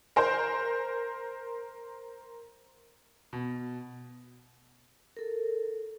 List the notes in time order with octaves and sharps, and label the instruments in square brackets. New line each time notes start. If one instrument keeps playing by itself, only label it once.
[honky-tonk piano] A#4 C5 G6
[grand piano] B2
[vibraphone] A4 A#4